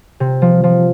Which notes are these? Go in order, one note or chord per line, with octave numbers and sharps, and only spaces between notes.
C3
F3
F3